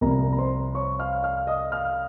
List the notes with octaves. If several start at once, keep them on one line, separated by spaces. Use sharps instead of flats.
C2 C3 F3 C4 A#4 A#5
A#5
C5 C6
C#5 C#6
F5 F6
F5 F6
D#5 D#6
F5 F6